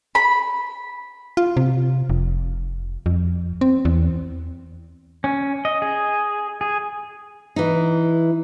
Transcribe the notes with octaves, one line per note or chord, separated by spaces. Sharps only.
B5
F4
C3
F1
F2
C4
E2
C#4
D#5
G#4
G#4
E3 D#4